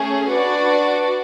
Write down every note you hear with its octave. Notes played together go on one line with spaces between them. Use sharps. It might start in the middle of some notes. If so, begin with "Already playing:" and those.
Already playing: A3 C#4 G#4
D4 F#4 B4 D5